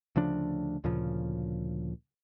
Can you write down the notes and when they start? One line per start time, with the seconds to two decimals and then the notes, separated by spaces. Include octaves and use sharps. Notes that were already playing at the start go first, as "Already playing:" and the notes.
0.16 D2 C#3 F3 D4
0.84 D2 A#2 C#3 F3